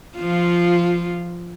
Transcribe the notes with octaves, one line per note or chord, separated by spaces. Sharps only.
F3 F4